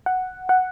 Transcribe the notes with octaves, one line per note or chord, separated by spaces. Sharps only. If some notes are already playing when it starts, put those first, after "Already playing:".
F#5
F#5